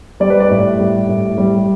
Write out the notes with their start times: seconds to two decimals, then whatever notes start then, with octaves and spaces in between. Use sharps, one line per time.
0.20 G3 D5
0.30 B4
0.40 D5
0.50 A2
0.79 G3
1.09 A2
1.38 G3